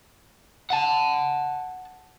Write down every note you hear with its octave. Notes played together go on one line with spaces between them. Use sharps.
F#5 A5